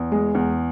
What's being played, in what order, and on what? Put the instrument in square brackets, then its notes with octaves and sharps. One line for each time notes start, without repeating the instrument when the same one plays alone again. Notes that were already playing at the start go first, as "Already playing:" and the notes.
Already playing: [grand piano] E2
G#3
E2